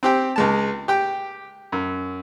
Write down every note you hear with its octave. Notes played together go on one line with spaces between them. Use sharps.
C4 G4 G5
C#2 G#3 A5
G4 G5
F#2